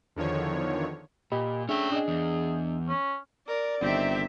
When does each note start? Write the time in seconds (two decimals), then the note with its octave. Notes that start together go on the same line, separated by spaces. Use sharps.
0.16 E2 D3 D#3 F3 C#5
1.32 A#2 G4 D#5 B5
1.69 A3 C#4 D4 G#4 E5 G5
1.92 D4 G#4 D#5
2.08 E2
2.88 C#4
3.48 A#4 D5
3.81 G1 D#3 C4 G4 E5